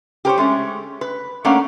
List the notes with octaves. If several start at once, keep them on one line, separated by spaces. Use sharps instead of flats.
G4 A#4 C5 C#5
G#3 A3 C#4
B4
A3 A#3 C#4 D4 F5 F#5